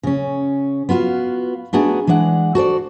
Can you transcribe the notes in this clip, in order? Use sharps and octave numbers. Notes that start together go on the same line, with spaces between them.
C#3 C#4
B3 F4 F#4 F5
A3 B3 D4 D#4 F#4 G#4
E3 G#3 D4 F#5
F#4 A4 C5 D5